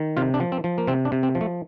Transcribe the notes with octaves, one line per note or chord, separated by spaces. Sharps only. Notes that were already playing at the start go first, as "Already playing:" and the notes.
Already playing: D#3
C3 F4
D4
F3
C4
F3
A#3
C3 C4
D4
C3
C4
F3
A3